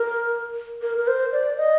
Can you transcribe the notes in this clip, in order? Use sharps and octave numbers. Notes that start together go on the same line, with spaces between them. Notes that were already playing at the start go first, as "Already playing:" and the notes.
Already playing: A#4
A#4
A#4
C5
D5
D#5